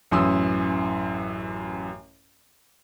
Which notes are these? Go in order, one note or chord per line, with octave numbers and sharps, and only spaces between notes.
A1 F#2 E3 C6 D#6 E6